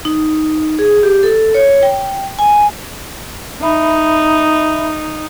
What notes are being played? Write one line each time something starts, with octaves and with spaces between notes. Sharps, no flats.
D#4
G#4
G4
A4
C#5
G5
G#5
D#4 E5 B5